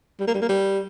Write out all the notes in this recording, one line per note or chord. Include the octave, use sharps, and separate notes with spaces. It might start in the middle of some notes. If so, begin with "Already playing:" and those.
G3
A#3
G3
A#3
G3